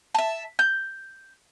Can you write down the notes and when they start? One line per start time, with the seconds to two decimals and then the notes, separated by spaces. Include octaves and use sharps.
0.15 E5 A5
0.59 G6